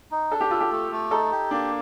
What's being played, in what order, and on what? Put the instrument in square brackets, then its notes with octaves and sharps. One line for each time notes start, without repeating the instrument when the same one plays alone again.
[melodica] D#4
[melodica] D4 [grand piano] A4
[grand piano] G4
[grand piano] F4 [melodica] A4
[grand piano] G4
[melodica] A3
A3
[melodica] D#4 [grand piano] A4
[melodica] G4
[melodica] A#3 [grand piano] D4